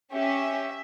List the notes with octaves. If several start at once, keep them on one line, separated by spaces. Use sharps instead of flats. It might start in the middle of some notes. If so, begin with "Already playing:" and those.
C#4 G4 E5